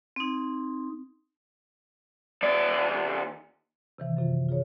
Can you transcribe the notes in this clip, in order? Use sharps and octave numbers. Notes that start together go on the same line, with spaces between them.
C4 D#4
D#2 D5
C3 D#3 E3
F#2 C3 F4
F4 G#4 C#5